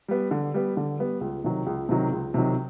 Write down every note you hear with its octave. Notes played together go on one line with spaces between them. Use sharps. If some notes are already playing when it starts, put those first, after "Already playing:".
G3 B3
D3
G3 B3
D3
G3 B3
C#2
C3 D#3 F#3
C#2
C3 D#3 F#3
C#2
C3 D#3 F#3